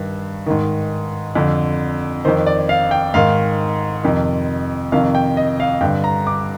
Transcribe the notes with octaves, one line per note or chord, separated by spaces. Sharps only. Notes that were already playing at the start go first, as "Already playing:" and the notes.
Already playing: G2 D#3
G#2 D#3
F2 D3
F2 D#3 C5
D5
F5
G5
G#2 D#3 F5
F2 C3 D#3
F2 C3 D#3 F5
G5
D#5
F5
G2 D3 G5
A#5
D6